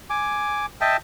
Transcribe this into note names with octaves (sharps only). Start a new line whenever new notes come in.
G#5 D6
D#5 E5 G5 A5